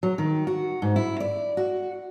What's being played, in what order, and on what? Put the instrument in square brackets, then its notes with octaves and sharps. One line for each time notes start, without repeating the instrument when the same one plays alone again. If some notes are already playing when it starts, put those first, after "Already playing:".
[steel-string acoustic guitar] F#3
D#3
F#4
G#2
E4
D5
F#4